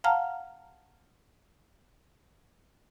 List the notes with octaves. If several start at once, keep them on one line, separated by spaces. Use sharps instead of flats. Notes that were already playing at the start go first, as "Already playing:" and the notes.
F5 F#5 A5 A#5 F6